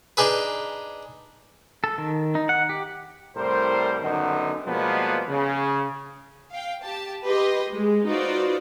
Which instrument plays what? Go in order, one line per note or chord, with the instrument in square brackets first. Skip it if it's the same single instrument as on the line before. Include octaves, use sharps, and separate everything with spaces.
[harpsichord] D4 D#4 G#4 B4
[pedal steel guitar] A4
D#3
D#4
F#5
G4
[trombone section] C2 A2 G3 A#4 C5
F#2 D3 D#3 B3 D#4
B2 F3 G3 G#3 A#3 B3
C#3
[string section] F5 G5
G4 A5
G4 B4 D#5 C6
G#3
D#4 F4 F#4 B4 C5 D5